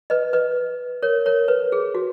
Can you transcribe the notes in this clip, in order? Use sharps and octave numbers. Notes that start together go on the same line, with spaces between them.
B4 D#5
B4 D#5
A#4 C#5
A#4 C#5
B4
G#4
F#4